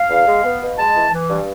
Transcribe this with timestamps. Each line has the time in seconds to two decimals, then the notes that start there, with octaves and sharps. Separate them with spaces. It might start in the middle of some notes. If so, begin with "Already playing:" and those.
Already playing: F5
0.09 E2
0.26 G#3
0.44 B3
0.61 B2
0.78 G#3 A5
0.95 E3
1.12 E3
1.29 G2